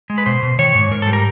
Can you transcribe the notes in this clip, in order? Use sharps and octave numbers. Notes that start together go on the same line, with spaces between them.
G#3
B4
B2 C5
B2
D#3 C#5
G#2
G#2 A#4
A4
G3
A#4